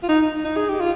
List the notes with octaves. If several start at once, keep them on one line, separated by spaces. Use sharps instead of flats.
F4
D#4
D#4
G#4
G4
F4